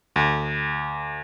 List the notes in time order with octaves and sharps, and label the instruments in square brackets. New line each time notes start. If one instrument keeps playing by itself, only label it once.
[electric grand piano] D2